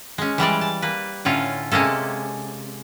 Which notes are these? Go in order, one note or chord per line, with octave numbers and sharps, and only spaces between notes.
G#3 C#4
E3 G3 G#3 D5
A5
A#3 B4
A2 D3 C#4 F4
C3 G#3 A#3 C#4 A4